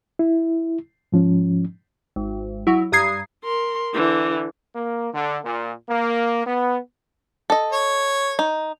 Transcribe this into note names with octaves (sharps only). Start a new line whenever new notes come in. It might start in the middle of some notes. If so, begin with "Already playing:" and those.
E4
G#2 F3 C#4
G#1
F#3 E4
G2 A#5 D#6 G#6 C7
A#4 C6
D3 E3
A#3
D3
A#2
A#3
B3
A4 D#5
C#5
D#4